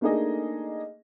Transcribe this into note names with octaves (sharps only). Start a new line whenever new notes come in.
A3 A#3 D4 D#4 G#4 D#5